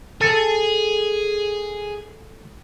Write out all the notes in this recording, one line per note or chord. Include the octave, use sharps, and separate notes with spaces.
G#4 A4